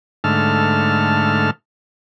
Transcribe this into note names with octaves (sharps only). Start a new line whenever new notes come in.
G#2 D3 A3 A5 F6